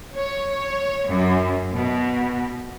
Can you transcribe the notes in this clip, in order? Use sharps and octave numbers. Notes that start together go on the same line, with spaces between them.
C#5
F#2
B2